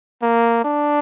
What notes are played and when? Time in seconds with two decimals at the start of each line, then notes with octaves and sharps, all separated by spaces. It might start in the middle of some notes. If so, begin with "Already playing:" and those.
0.22 A#3
0.64 D4